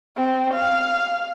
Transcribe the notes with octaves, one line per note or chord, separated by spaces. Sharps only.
C4
F5